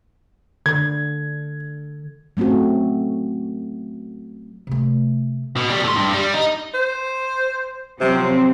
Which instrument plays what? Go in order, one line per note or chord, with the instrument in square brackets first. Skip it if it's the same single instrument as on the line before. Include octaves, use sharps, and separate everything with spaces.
[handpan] D3 [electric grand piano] G#6
[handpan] F#3 A3 C4 C#4 F#4
[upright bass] C3 A3
[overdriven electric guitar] B2
B2 G3
A2 C6
G2
G3
D#4
[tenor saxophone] C5
[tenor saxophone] C3 [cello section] F3 F#3 C4